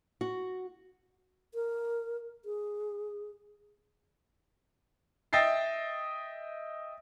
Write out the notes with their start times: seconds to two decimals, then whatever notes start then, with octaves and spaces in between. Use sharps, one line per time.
0.21 F#4
1.54 A#4
2.45 G#4
5.33 D#5 E5 G5 A6 C7